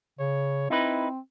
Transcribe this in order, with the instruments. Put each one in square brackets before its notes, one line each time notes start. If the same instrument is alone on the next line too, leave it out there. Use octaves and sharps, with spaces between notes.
[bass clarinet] C#3 [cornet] C#5
[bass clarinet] C4 [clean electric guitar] D#4 B4 [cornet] E4